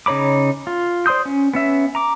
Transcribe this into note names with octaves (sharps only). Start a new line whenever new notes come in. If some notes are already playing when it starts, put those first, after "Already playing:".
C#3 D#4 C#5 B5 D6
F4
C5 D5 C6 D#6 G6
C#4
B3 C#4 E5
A#5 D6